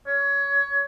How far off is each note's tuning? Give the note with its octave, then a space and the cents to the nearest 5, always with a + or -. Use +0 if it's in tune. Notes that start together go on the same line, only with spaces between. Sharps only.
C#5 +20